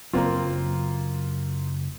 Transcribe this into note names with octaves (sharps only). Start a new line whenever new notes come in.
F#1 F#3 A#3 C4 F4